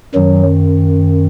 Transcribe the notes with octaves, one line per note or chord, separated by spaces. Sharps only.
F#2 D#3 F#3